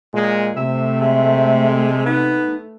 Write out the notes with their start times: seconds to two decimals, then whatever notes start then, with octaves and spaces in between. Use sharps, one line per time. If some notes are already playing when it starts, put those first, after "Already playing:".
0.13 A#2 G#3
0.56 C3 A3 E5
1.01 G#3 E5
2.06 B3 D#4